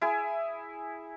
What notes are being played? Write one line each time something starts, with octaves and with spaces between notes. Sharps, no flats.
E4 G#4 G#5